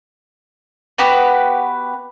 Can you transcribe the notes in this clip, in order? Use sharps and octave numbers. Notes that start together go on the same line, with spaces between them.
B3 F#4 G4 B4